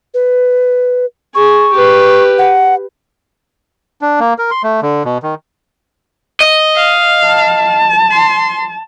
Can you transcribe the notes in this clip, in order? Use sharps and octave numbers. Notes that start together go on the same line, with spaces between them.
B4
G#4 C#6
G4 B4
F#5
D4
A#3
A#4
C6
A3
D3
B2
D#3
D#5
F5
A5
C6